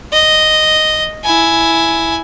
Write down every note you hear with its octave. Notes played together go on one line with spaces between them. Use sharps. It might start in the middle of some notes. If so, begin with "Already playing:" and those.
D#5
E4 G#5